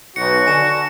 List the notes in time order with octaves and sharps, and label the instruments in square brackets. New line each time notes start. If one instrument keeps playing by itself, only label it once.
[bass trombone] B1 [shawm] F#4 [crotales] C#7
[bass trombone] D3 [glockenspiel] G#5 C#6 E7